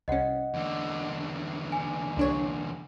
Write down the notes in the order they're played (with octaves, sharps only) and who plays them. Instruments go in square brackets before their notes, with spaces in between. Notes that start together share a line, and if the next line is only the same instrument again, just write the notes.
[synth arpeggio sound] C2 C#4 [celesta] D#5 F#5
[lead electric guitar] E2 D3
[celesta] G#5
[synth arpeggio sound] C2 D4 C#5